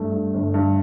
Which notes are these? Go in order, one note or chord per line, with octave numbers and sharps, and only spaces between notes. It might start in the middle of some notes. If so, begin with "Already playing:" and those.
Already playing: G2 A3
G2
G1
G2